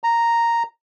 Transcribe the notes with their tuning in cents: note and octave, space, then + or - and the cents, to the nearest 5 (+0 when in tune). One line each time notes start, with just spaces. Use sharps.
A#5 -5